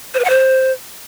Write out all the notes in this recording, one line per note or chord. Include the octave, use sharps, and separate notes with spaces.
C5
B4
F#5
C5